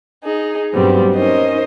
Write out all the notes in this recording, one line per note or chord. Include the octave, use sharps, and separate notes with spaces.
D#4 G#4
G2 A#2 F#3 G3 B3 C4
C#4 D#4 A#4 C5 D#5